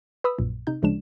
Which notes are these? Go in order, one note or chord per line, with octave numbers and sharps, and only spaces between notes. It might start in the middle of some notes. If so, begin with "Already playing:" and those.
B4 B5 D#6 E6
A#1 F#2 A#2
C3 D#4 G6
D2 C#3 F3 G#3 D4 E7